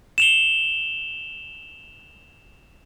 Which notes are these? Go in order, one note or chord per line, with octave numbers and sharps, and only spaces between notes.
E7 F7 G7